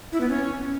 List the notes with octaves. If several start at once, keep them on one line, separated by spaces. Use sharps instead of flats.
E4
B3
C#4